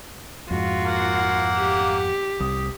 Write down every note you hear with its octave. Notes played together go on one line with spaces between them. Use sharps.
F2 G#2 F4 F#4
A#3 F#5
G4
C2 D#6